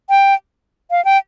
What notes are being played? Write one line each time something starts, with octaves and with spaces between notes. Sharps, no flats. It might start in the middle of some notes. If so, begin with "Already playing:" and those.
G5
F5
G5